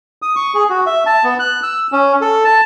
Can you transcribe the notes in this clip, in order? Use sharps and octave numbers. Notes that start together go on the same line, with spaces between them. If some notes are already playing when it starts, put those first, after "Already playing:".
D#6
C#6
G#4
F#4
E5
A5
B3
F#6
E6
C#4
A4
A5